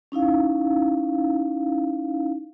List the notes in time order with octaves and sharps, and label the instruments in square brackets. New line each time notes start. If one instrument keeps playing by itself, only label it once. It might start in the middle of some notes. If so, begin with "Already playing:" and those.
[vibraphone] C#4 D#4 E4 F5